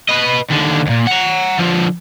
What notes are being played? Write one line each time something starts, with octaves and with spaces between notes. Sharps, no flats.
B4 D#5
D#2 D3
D#2 A#2
F#5 A#5
D3 F3